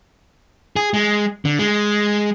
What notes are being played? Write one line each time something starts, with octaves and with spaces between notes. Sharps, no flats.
G#4
G#3
D3
G#3